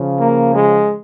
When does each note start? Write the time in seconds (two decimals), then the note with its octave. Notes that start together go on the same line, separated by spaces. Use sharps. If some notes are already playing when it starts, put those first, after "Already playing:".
Already playing: C#3 F3
0.18 A#3
0.54 G#3